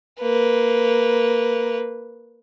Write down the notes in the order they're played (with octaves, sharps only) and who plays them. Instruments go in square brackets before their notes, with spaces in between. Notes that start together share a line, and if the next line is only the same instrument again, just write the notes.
[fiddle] A#3 B4